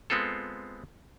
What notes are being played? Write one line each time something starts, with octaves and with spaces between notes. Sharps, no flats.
G#3 B3 C4 F4 A4